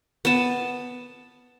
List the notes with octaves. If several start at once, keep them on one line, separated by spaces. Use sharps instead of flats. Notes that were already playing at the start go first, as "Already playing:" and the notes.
B3 A5